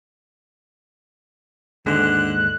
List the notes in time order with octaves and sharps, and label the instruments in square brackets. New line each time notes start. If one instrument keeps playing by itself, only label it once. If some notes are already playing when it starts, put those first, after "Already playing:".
[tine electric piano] D#2 G#2 G#3 [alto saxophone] D3 [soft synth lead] F#6